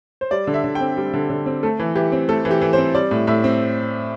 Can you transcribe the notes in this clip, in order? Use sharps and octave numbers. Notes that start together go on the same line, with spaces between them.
C5
G3 D5
D3
E5
D3
G5
C4
G3
D3
D3
C4
A3 A4
E3
E3 G4
C4
A3 A4
E3
G4
E3
C4 C5
G3 D5
A2
A2 E5
C4